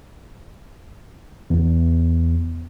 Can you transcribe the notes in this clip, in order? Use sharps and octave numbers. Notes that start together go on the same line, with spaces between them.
E2